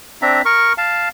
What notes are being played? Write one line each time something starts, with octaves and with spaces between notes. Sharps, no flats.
C4 D4 E5 A#5
A#4 C#6
F5 A5